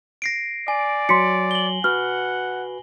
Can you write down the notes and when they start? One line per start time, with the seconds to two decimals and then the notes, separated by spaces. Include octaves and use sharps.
0.22 A#6 C7 D7
0.68 D5 G#5
1.09 F#3 C6 B6 C#7
1.51 F#7 G7
1.84 F#4 B4 F#5 F6